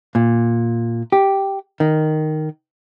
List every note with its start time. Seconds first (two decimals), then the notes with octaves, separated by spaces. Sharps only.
0.15 A#2
1.12 G4
1.80 D#3